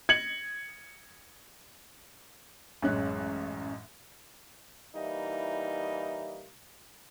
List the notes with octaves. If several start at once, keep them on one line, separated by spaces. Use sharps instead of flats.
G#6 C#7 F#7
A1 F#2 G#3 C#4 F#6
E3 G3 A#3 D#4 E4